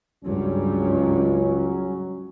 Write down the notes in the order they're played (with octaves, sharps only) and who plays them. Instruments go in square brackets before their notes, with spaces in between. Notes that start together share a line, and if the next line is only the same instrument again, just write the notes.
[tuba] C#2 [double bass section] G2 [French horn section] F#3 C#4